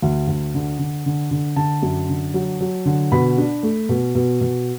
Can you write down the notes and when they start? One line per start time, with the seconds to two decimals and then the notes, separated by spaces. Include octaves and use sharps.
0.02 D2
0.28 D2
0.55 D3
0.79 D3
1.06 D3
1.31 D3
1.56 D3 A5
1.82 F#2
2.09 D3
2.34 F#3
2.61 F#3
2.85 D3
3.12 B2 B5
3.38 D4
3.63 A3
3.89 B2
4.15 B2
4.41 B2